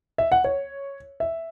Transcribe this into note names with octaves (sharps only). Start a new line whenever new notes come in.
E5
F#5
C#5
E5